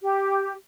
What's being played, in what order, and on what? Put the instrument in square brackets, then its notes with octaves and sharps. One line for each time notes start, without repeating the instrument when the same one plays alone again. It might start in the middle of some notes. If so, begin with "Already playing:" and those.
[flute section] G4